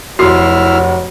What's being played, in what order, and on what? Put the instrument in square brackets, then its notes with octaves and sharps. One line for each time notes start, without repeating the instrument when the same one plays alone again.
[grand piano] F1 C7 [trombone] F#3 [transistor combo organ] E4 F6 [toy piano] F#4 A4 C6